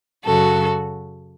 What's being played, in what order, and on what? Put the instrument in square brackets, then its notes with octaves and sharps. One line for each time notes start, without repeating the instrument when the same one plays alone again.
[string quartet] F#2 C#3 F#3 F#4 A4